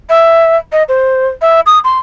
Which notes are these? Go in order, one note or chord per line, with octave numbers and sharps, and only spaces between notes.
E5
D#5
C5
E5
D#6
C6